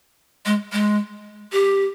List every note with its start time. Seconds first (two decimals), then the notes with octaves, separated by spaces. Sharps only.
0.46 G#3
0.73 G#3
1.52 G4